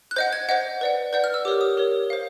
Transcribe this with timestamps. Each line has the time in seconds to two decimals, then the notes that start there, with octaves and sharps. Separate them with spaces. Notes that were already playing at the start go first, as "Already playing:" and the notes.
0.11 F#6
0.16 C5 D#5 F#5 G6
0.33 G#6
0.49 C5 D#5 F#5
0.81 B4 D5 F#5
1.13 B4 D5 F#5 G6
1.24 F6
1.34 E6
1.45 G4 A#4 C#5 D6
1.61 D#6
1.77 G4 A#4 C#5
2.10 C5 F5